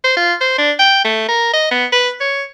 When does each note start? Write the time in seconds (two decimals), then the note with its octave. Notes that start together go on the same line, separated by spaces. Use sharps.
0.04 C5
0.17 F4
0.41 C5
0.58 D4
0.79 G5
1.04 A3
1.28 A#4
1.53 D#5
1.71 B3
1.92 B4
2.20 C#5